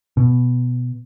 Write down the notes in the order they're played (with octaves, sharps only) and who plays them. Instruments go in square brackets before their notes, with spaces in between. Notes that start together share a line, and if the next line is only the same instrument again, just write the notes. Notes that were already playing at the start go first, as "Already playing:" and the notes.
[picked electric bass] B2